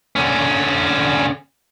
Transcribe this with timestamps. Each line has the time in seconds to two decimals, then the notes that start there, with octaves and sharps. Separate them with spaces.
0.16 D3 C#4